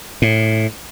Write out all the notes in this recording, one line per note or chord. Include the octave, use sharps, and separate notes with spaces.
A2